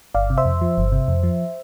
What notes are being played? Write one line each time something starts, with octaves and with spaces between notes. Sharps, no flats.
G1 D5 F5
C3
C5 E5
F2
F3
G1
C3
F2
F3